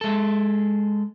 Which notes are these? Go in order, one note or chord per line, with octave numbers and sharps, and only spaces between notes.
G#3 A4